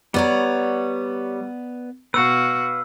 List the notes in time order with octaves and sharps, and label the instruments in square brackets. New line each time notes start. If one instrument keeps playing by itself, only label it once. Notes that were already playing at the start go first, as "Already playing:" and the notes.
[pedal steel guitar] G3 C#5 [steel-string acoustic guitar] B3 D5 A#5
[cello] B2 F#4 [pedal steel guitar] B4 F5 [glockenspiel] E6